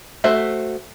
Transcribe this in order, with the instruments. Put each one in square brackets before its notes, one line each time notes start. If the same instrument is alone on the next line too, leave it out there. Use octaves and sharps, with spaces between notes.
[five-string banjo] A3 F#4 C5 E5